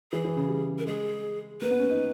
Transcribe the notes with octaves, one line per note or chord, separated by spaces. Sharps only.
E3 G#4
E3
C#3
G3
A#4
G#3 G#4
A#3 B4
B3
C#4
D#4